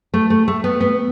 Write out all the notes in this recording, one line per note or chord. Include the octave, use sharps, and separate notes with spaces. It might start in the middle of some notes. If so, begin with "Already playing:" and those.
A3
A3
A3
B3
B3